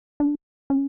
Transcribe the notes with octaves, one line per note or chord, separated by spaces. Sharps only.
D4
C#4